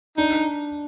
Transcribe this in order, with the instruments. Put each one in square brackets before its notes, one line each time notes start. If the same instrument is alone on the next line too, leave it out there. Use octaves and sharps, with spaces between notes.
[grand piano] D4 [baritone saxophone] D#4